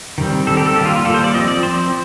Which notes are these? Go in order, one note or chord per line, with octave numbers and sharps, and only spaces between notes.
D#3 G3 C4
D#3 G3 C4 A4
G4
A4
D#3 G3 A#3 G4
F4
F4
D#3 G3 A#3 A4
C5
D5
F3 C4 D#5
D5
F3 C4 C5